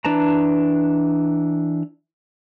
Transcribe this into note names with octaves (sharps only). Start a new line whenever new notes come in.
E3 D4 B4 A5 A#5